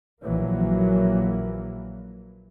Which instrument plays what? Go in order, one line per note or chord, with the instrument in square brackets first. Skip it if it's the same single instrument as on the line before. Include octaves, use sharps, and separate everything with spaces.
[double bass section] A#1 E3 F#3 A#3